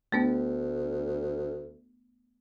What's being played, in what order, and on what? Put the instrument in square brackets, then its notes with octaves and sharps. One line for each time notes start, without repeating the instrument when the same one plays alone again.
[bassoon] D2 [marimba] A3 B3 D4